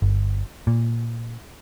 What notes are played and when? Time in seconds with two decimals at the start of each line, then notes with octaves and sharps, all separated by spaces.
0.02 G1
0.67 A#2